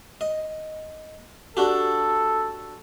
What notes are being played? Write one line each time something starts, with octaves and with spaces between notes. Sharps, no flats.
D#5
D4 F#4 G4 A4